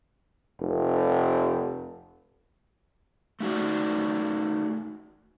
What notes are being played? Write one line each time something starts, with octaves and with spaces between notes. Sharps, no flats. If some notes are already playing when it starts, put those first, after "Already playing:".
F1
A3 D#4 F#4 D5